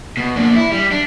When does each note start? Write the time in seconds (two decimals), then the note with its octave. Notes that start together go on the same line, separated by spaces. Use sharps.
0.17 B2
0.36 A#3 D4
0.56 E4
0.72 G3
0.91 D4